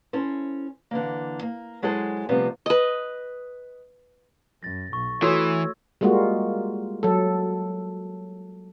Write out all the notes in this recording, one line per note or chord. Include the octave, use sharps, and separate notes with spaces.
C#4 E4 A4 C5
D3 E3 A#3
A#3
F#3 G#3 E4 G#4 A4 C5
C3 F3 G3 A3 B3 C4
B4 D#5
F#2 A6 A#6
B1 C#6
E3 A3 F#4 A4 C#5 E6 G#6
G3 G#3 A#3 F4 F#4
F#3 A4